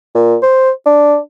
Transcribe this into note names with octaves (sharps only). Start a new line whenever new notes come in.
A#2
C5
D4